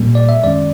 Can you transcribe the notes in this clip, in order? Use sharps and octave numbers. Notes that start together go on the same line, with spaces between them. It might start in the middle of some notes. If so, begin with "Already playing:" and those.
Already playing: A#2 G3 A#3
D5
E5
F#2 D#3 G#3 C#4 D5